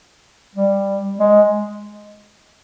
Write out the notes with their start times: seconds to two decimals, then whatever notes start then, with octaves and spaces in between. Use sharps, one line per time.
0.55 G3
1.19 G#3